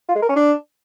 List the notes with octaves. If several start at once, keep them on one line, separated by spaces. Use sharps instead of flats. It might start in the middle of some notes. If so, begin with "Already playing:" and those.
F4
G#3
A#4
C#4
D4